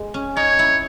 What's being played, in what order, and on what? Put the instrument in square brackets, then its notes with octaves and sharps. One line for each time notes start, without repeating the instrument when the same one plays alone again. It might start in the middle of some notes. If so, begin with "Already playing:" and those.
Already playing: [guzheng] G#3
C#4
[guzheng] D#4 [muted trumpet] C#5
[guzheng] E4